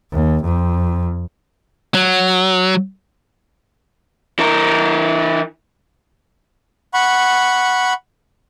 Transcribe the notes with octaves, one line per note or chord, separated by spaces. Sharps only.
D#2
F2
F#3
E3 A#4
F#5 B5 C#6